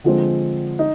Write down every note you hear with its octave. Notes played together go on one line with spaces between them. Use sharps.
D3 F3 G#3 C4
D#4